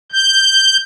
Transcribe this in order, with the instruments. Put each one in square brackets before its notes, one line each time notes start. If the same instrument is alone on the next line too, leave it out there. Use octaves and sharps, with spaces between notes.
[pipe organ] G6